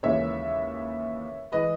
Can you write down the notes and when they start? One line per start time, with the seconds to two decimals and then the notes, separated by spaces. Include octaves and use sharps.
0.03 D#2 C#3 E3 G#3 C#5 E5
1.52 E3 G#3 B4 D#5